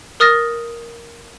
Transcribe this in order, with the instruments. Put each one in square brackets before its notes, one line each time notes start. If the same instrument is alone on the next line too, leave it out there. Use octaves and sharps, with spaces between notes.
[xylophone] A#4 D#6 F6 A6 A#6